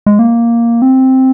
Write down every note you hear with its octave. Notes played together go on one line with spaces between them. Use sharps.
G#3
A#3
C4